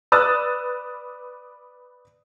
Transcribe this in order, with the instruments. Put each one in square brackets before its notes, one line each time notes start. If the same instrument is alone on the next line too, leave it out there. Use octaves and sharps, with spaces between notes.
[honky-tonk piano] B4 D5 D#6 E6 F#6 A6